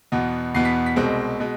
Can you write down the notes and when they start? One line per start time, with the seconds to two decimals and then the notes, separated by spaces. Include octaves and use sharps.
0.12 E2 B2 B3
0.54 E2 B2 B3 C7
0.65 B6
0.86 B6
0.96 C2 B2 G#3 C4
1.40 B2 G#3